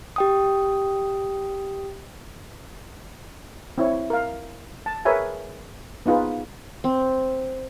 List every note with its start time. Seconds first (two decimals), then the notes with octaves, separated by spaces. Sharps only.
0.16 G4 G5 D#6
3.78 C4 E4 C#5
4.10 A#4 F5
4.86 A5
5.05 G#4 A#4 B4 C#5 E5 G#5
6.06 B3 D#4 F4 G#4 B4
6.84 C4